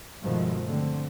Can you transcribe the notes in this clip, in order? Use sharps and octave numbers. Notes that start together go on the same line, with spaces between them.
G2 B2 D#3 F3 G#3 A3
D3 A3 C4